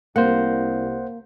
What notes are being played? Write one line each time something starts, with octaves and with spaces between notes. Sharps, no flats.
C2 A#3 C5 F#5